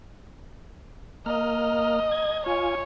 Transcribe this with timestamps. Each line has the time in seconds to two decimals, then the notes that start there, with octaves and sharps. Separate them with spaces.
1.26 A#3 D#5 F6
2.11 G#6
2.46 F4 C#5 G#5